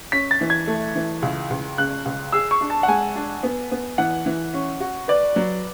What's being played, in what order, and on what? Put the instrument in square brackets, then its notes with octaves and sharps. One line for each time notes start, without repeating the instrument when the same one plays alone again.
[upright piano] C#4 [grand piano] B6
[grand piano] A6
[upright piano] E3
[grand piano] G#6
[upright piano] A3
E3
C#2
C#2
[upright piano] C#3 [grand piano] F#6
[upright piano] C#2
[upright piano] G#4 [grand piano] E6
[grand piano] C#6
[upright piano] D4
[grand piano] A5
F#5
[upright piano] G#3 [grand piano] G#5
[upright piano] D4
B3
B3
[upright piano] E3 [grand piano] F#5
[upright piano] E3
C#4
F#4
[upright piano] B4 [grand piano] D5
[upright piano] F#3